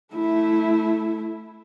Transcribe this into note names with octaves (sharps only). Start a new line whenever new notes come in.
A3 E4